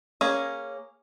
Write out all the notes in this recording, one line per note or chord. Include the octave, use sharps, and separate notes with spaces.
A#3 C#4 G#4